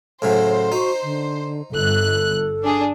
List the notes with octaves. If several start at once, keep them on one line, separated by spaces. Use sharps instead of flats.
A2 C#3 F#3 C5
D#4 F#4
D3
G1 A4 F#6
D4 G#4